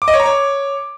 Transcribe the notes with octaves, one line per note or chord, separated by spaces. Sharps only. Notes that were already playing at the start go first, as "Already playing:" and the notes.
D6
D#5
C#5
A#5
C#5